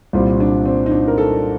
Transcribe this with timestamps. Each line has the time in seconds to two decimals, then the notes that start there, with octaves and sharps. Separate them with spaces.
0.13 C2 A#2 G3 C4
0.40 D4
0.66 C4
0.86 D#4
0.92 D4
1.08 A#4
1.18 A4